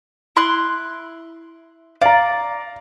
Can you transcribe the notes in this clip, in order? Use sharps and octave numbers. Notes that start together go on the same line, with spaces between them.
E4 C6 F#6
D5 F5 A#5